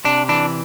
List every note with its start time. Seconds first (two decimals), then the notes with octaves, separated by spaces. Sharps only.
0.04 C3 D4
0.29 E3 D4